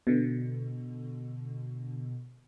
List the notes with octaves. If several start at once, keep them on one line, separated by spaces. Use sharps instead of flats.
B2 D3